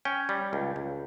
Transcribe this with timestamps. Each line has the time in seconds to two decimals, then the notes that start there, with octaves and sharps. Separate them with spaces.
0.05 C#4 G5
0.29 G3
0.53 C#2
0.76 C#2